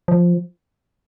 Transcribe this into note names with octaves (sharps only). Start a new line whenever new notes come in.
F3